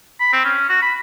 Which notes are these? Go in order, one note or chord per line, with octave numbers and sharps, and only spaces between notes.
B5
C4
C#4
F#4
B5